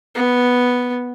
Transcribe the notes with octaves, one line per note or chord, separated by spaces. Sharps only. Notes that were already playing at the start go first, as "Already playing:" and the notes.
B3